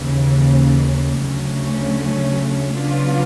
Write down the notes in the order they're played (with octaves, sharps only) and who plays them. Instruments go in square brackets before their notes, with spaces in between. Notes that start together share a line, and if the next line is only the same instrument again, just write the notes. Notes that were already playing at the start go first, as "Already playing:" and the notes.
Already playing: [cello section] D#2 C#3 E3
D2 C#3 F#3 A3 C#4
C#3 F#3 B3 D4 F4